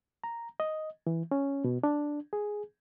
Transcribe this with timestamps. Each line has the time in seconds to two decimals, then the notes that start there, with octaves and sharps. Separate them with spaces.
0.24 A#5
0.60 D#5
1.07 E3
1.31 C#4
1.64 B2
1.83 D4
2.33 G#4